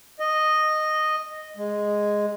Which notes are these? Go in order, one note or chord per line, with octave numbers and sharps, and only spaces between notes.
D#5
G#3